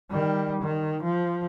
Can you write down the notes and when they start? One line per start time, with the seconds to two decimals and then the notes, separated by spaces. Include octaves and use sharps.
0.11 D#3 G3
0.62 D#3
1.03 F3